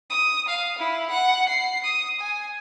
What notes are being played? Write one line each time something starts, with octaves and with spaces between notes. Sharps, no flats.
D#6
F5
E4
F#5
C7
D#6
G#5